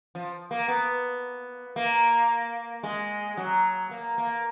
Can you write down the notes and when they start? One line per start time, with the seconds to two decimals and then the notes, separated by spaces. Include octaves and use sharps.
0.15 F3
0.51 A#3
0.68 B3
1.76 A#3
2.83 G#3
3.37 F#3
3.91 A#3
4.18 A#3